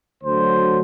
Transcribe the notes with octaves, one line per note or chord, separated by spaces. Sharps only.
D2 D3 F#3 C5